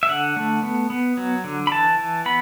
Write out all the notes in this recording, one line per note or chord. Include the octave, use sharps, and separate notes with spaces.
E5
D3 F#5
A3
B3
B3
F#3
D3
B5
E3 A5
E3
B3 B5